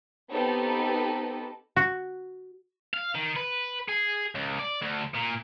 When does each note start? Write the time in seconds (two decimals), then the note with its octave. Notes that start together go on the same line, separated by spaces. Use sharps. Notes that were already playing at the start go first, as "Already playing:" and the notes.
0.31 B3 C4 D#4 G4 A4 B4
1.76 F#4
2.94 F5
3.15 D#3
3.36 B4
3.89 G#4
4.35 C#2
4.60 D5
4.82 D2
5.15 A#2